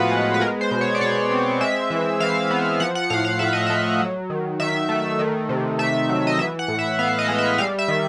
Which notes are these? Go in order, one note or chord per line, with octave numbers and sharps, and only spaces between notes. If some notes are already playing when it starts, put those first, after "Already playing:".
Already playing: A2 F3 B3 F4 F#4 B4
G#3
B4
G#3 A#4
C5
B2
C#5
D5
B2 C#5
C4
G#3 E5
E3
E3 F5
B3
F3 F#5
F#5
A2 F5
F5
A2 E5
D#5
A3 E5
F#3
D#3
D#3 E5
A3
D#3
C3
A3 E5
F#3
D#5
E3 E5
F#5
A2
E5
B3 F5
D#5
G#3
E5
G3 F5
E5
D#3